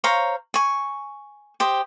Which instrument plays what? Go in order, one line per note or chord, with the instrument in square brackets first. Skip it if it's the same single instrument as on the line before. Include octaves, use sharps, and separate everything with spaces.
[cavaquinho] C5 C#5 F5 A#5
G#5 C#6
G4 C5 D#5